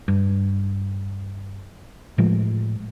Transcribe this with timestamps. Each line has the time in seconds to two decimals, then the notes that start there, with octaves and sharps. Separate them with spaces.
0.08 G2
2.18 A2 F3 G#3